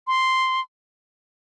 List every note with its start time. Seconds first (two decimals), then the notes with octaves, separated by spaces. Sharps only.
0.07 C6